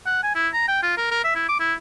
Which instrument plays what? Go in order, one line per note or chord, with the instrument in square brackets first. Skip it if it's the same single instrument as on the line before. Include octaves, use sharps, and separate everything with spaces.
[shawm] F#5
G#5
E4
A#5
G5
F4
A#4
A#4
E5
E4
D6
E4